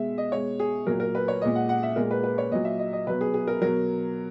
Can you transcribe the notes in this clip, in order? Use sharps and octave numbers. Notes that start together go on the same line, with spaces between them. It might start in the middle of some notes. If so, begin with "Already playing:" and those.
Already playing: B2 G#3 E5
D#5
B2 G#3 C#5
G#4
A#2 F#3 A#4
A#4
B4
C#5
A#2 G#3 D#5
F#5
F#5
E5
A#2 G#3 A#4
B4
B4
C#5
A#2 F#3 D#5
E5
D#5
D#5
B2 F#3 B4
G#4
G#4
A#4
B2 F#3 A#4